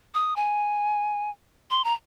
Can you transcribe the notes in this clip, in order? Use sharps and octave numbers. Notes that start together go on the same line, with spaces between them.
D#6
G#5
C6
A#5